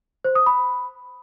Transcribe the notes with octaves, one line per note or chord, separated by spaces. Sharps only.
C5
D#6
B5